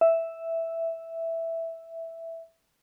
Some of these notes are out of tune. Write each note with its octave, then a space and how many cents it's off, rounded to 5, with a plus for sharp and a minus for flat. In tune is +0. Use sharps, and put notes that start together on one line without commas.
E5 +0